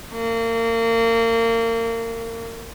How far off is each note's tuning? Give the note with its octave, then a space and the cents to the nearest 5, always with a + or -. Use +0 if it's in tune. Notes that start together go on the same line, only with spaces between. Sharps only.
A#3 -30